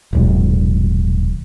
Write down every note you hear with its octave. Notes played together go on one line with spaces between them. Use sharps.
D#1 B1 G#2